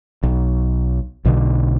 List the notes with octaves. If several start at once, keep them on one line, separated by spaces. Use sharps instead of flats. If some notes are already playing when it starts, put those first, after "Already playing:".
B1
B1 B2 D3